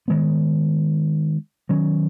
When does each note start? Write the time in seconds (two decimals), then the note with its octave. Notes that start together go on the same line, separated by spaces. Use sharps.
0.08 D#3 G#3 B3
1.69 D#3 F#3 C#4